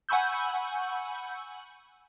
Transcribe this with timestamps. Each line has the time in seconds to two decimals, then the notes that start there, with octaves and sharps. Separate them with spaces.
0.09 F#5 G#5 B5 C#6 E6 G6